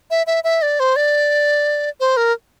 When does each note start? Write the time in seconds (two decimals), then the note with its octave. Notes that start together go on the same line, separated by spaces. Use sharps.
0.11 E5
0.27 E5
0.44 E5
0.62 D5
0.80 C5
0.96 D5
2.00 C5
2.17 A#4